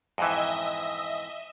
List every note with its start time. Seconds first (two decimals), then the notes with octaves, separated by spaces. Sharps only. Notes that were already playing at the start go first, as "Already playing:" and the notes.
0.18 F2 G#2 E3 D#5 E5